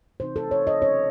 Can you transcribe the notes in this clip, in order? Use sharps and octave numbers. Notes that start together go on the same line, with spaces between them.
C3 E3 C4 D#4 C5
A4
C#5
D#5
C#3 F#3 C#4 C#5